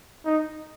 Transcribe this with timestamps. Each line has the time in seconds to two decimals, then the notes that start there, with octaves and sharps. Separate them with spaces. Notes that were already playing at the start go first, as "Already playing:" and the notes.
0.26 D#4